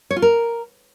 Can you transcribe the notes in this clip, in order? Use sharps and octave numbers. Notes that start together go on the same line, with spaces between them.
C#5
F4
A#4